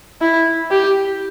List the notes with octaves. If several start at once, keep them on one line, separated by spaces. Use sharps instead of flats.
E4
G4